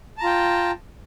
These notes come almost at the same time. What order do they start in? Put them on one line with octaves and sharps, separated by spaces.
A5 A#5 F4 G5